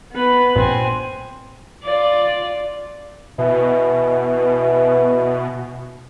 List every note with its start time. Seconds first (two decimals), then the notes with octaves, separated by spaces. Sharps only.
0.12 B3 B4
0.56 A#1 G2 A#2 C4 G#5
1.84 F4 D5
3.39 B2 E3